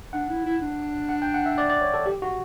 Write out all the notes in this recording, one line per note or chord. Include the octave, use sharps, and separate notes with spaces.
D4 F#5
E4
E4
D4
F#5
G5
F#5
E5
D5
D5
C#5
A4
G4
F#4